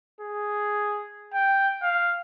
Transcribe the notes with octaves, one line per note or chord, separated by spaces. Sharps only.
G#4
G5
F5